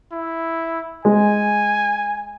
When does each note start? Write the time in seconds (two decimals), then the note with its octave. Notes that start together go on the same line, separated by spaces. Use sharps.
0.12 E4
1.05 G#3 G#5